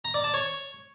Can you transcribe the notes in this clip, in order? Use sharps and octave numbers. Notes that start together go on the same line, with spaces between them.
A#5
D5
A5
C#5